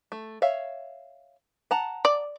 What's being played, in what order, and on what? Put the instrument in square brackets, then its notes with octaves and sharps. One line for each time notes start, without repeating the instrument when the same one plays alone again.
[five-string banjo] A3
C#5 E5 F5
F#5 A5 A#5
[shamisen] D5